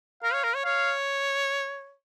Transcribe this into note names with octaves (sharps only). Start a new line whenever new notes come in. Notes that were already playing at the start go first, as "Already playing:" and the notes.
A#4 F5
C#5
A#4
C#5
C#5 F5